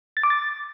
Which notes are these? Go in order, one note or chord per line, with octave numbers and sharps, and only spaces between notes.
A6
D6
A6